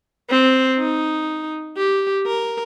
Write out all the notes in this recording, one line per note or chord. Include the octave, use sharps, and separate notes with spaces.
C4
D#4
G4
A#4